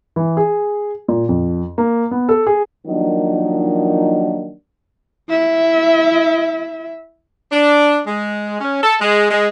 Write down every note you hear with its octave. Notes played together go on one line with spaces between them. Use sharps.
E3
G#4
A#2
F2
A#3
B3
A4
G#4
D#3 F3 F#3 A#3 D4 D#4
E4 E5
D4
G#3
C#4
A4
G#3
G#3